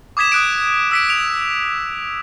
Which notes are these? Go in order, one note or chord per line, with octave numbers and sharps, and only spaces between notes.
D6 D#6 G#6 B6 E7
D#6 F#6 D7
E6 B6 D7
D7 F7